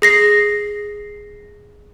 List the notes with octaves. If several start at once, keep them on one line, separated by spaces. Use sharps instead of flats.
G#4 A#6 C7